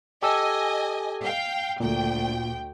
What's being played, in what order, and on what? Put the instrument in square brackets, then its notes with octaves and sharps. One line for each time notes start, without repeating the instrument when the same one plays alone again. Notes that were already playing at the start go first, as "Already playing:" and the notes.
[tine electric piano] G4 A4 E6 [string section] D#5 G#5
[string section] F5 G5
[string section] D2 G5 [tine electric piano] A#2